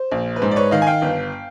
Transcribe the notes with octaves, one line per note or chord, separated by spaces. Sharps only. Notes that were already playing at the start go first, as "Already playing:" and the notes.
Already playing: C5
A#1
B4
G#2 C5
D5
B4 C#5
D#3 D#5 F5
G#5
F5 G5
G1